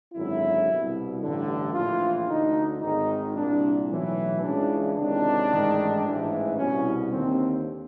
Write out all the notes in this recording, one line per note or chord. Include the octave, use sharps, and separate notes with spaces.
G#1 F#2 D3 E4
C2 B2
A1 G2 D3
A#1 A2 E3 F4
D2 D3 D#4
G#1 G#2 D#3 D#4
C2 A#2 D4
B1 A2 E3
C#2 C#3 E3 D4
C#2 C3 D#3 D4
A1 G#2 D#3
A1 G#2 E3
C2 B2 C#4
D#2 D3 C4